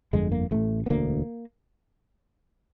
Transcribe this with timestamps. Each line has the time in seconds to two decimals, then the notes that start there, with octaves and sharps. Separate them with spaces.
0.13 G1 F2 D3 G#3
0.32 A#3
0.51 A1 A2 A3
0.86 B3
0.90 E1 D2 D3 A#3